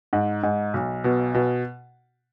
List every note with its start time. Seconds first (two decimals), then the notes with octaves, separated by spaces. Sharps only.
0.13 G#2
0.43 G#2
0.74 B1
1.04 B2
1.34 B2